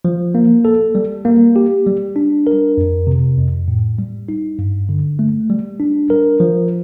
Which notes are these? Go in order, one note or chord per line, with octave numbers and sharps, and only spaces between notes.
F3
A#3
A4
G3
A#3
G4
G3
D4
A#4
F2
C3
F2
A2
G3
D#4
G2
D3
A3
G3
D4
A#4
F3